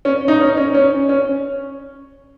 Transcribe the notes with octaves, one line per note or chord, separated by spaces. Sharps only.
C#4
D#4
C#4
C#4
C#4
C#4